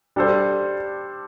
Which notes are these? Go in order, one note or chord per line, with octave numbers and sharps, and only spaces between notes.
G3 D4 A4 C5